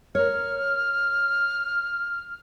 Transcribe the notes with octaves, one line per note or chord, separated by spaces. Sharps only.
A#4 C#5 F6